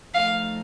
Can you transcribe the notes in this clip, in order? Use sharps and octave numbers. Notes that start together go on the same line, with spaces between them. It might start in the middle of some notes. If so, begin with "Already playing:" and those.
F3 A3 D#4 F5